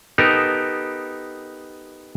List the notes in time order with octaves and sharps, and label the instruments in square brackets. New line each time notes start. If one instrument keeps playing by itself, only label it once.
[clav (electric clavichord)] B3 D#4 G4 A4 A#4